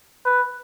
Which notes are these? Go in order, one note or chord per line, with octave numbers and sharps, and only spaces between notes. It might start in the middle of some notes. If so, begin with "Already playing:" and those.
B4